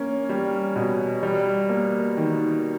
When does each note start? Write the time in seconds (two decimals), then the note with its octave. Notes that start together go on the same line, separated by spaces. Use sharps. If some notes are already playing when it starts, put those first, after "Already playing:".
Already playing: A#3 C#4
0.29 G3
0.76 B2
1.23 G3
1.69 A#3
2.17 D#3